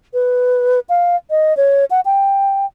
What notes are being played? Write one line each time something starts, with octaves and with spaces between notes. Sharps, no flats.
B4
F5
D#5
C#5
F#5
G5